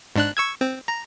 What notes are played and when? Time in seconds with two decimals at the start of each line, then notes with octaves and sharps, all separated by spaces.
0.16 G#2 D4 F#6
0.37 C#6 E6 G#6
0.61 C4
0.88 A#5